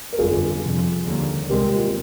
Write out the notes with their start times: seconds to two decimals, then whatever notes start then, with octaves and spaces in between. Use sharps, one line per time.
0.13 A#4
0.19 G1 F2 D3 G#3 F4 G#4
0.63 F2 C3 F3
1.06 D#2 D3 G3 A#3
1.49 C2 A#2 G#3 C4 G4 A#4
1.75 F4
1.84 G4